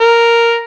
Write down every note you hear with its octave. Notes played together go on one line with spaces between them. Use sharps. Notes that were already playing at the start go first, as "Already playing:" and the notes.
A#4